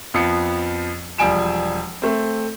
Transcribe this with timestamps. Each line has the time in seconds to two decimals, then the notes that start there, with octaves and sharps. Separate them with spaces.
0.14 F2 F3 B3 C#7
1.18 E1 F3 G3 G#5 D7 E7
2.02 A3 C4